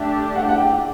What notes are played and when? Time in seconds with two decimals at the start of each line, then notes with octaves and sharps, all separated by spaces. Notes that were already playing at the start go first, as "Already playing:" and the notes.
Already playing: A3 D4 G4 E5
0.36 F#5
0.49 F#5
0.58 G5